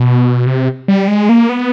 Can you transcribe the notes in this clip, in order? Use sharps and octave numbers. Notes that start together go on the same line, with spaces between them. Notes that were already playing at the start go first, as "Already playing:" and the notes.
Already playing: B2
C3
G3
G#3
A#3
B3